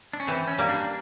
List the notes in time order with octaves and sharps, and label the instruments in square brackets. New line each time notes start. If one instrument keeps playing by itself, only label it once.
[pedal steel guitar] D4
C#4
[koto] E3 [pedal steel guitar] C4
[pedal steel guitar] C#4
[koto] G3 A#3
[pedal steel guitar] D4